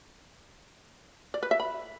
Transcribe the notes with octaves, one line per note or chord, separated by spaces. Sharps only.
D5
B4
E5
B5